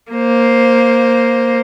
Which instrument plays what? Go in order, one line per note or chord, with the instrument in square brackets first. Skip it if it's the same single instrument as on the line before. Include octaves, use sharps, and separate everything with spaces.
[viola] A#3 C5